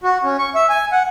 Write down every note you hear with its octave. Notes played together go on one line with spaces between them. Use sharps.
F#4
C#4
C#6
E5
G#5
F#5